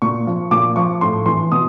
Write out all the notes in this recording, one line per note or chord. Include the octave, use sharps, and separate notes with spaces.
A#2 C#6
F3
A#2 D6
F3 C#6
A2 C6
E3 C6
B2 D#6